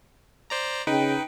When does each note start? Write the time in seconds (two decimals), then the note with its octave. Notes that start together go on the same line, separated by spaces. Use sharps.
0.50 C5 D5 A#5
0.87 C#3 D#4 B4 G5